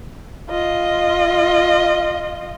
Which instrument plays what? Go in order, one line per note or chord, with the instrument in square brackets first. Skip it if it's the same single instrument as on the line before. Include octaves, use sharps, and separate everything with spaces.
[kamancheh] F4 D#5